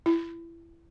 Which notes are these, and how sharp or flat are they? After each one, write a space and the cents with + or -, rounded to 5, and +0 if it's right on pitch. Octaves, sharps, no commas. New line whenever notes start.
E4 +25